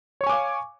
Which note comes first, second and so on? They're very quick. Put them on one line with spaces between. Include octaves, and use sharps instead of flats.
C#5 C#6 G#5 D6 F5